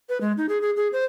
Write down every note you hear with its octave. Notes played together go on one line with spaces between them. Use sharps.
B4
G#3
D#4
G#4
G#4
G#4
C5